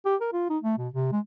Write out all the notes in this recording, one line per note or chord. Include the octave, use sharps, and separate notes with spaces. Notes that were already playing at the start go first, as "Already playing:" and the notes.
G4
A#4
F4
D#4
A3
B2
C3
G#3